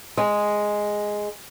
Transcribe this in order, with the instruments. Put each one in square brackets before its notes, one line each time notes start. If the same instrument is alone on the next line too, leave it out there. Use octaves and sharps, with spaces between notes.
[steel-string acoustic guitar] G#3